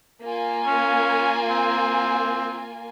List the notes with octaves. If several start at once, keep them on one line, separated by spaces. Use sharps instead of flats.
A#3 F4 G#5
C#4
C4